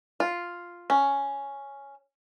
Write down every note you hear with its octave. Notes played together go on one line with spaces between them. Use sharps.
F4
C#4